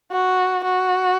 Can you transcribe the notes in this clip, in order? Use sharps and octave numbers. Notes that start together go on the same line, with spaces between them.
F#4
F#4